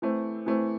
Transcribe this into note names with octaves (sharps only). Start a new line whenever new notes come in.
E3 A3 C4
E3 A3 C4